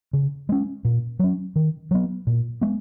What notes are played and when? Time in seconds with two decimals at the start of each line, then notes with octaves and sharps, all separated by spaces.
0.13 C#3
0.49 G#3 C#4
0.85 A#2
1.19 F#3 C#4
1.56 D#3
1.91 F#3 B3
2.27 A#2
2.61 G#3 B3